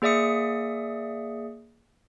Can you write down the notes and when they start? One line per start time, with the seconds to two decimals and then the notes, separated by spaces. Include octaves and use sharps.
0.02 A#3 G#4 D5 E5 D#6 C#7